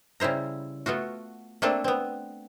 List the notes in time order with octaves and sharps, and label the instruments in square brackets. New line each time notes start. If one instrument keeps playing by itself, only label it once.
[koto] C#3 G3 E4 C5 A#5
A3 B3 F4 F#4
A3 A#3 C4 D4 A4
B3 C4